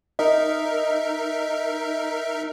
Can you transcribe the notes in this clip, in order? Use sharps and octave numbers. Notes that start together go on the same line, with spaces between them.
D#4 A#4 D#5 E5